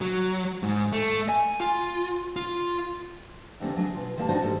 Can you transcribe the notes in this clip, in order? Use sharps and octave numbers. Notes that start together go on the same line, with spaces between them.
F#3
G#2
A3
G#5
F4
F4
D#2 D3 A3 A#3 C4 C#4
D2 F#3 D4 G#4 D#5 G#5
B2 F4
D#3 G3 A#3 E4 E5 A5
D#3 D4 D#4 F#4 C5 D5
G#2 G3 G#3 A#3 A4